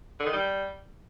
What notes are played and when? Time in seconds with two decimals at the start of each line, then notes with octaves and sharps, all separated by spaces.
0.20 D3
0.26 D#3
0.33 G3